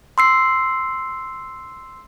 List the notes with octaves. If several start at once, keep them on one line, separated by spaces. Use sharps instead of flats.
C6 E6 C7